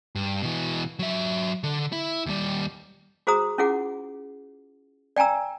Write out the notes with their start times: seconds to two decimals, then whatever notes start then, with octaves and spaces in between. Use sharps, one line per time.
0.15 G2
0.42 B2 E3
0.99 F#3 E5
1.64 D3
1.92 E4
2.26 D#2 G3
3.27 F#4 G#4 C5 A#5 D#6
3.58 C#4 E4 F4 G#4 F#5 D6
5.16 D5 G5 G#5 A#5 E6